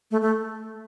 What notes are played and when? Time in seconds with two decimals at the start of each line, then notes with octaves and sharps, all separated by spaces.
0.11 A3
0.21 A3